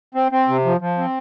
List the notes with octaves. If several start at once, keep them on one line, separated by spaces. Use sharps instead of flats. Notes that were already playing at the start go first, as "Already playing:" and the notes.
C4
C4
C3
F3
F3
C4